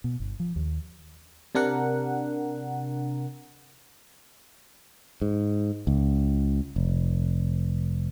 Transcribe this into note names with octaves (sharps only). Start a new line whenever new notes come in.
B2
G1
F3
D#2
C3 D4 A#4 F#5
G#2
C#2
F1